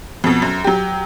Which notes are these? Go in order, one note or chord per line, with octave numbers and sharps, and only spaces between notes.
F2 B2
F#2
F#3 G4